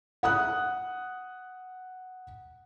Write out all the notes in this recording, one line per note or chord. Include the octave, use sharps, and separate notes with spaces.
F#5 D#6 F#6